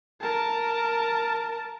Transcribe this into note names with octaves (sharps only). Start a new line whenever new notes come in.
A#4 A5